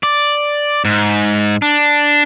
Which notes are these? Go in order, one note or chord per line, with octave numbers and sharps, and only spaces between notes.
D5
G#2
D4